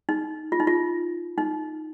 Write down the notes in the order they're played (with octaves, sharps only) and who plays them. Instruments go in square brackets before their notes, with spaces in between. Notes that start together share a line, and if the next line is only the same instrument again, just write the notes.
[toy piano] D#4
F4
D#4
F4
D#4